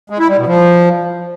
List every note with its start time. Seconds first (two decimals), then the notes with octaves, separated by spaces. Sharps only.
0.10 G#3
0.19 E4
0.28 G3
0.38 B2
0.47 F3